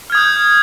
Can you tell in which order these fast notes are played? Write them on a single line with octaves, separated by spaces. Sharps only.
F6 G#6 D#6 G6